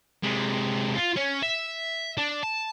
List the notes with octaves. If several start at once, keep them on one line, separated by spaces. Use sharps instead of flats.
C3 G#3
F4
C#4
E5
D4
A5